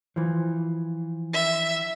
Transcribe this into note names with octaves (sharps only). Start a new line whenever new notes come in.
E3 F3
E5